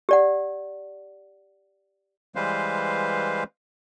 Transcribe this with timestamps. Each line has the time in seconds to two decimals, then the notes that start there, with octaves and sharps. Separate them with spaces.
0.09 G4 D5 F#5
2.35 E3 G3 G#3 B4 C5 F5